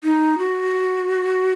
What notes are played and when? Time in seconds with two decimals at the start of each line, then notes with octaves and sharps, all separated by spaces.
0.04 D#4
0.38 F#4